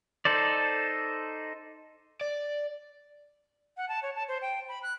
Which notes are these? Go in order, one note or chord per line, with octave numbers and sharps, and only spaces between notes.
D#4 A4 C5 D5
D5
F#5
A5
C#5
A5
C5
G5
B5
F#6